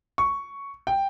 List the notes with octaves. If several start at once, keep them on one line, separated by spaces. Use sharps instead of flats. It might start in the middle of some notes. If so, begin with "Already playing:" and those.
C#6
G5